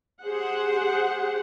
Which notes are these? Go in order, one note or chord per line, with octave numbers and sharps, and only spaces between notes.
G4 G#4 C5 F#5